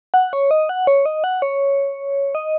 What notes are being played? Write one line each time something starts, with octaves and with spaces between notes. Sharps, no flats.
F#5
C#5
D#5
F#5
C#5
D#5
F#5
C#5
D#5